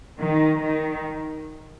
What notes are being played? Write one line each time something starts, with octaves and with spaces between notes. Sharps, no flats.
D#3
D#3